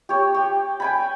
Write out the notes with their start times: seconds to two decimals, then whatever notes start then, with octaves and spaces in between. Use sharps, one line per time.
0.09 G4 C#5
0.35 G4
0.80 G5 G#5 B5